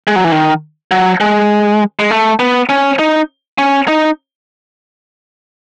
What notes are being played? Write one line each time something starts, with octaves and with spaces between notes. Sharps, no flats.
G#3
F#3
E3
D#3
F#3
G#3
G#3
A3
B3
C#4
D#4
C#4
D#4